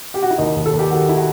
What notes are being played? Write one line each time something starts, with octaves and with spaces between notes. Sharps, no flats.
G4
F#4
E4
D#2 D#4
D#2
A4
D#2
G4
D#3 F#4
E4
F#4